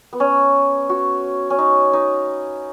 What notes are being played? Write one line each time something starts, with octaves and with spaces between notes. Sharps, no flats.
B3
C#4
F#4
C#4
D#4
D#4